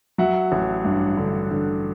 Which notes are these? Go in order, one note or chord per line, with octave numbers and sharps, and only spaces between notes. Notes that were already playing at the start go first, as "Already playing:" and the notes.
F#3 E5 F#5
A1
G2
D3
D3